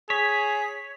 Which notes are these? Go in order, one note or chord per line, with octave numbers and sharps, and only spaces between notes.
G#4 C#5 B6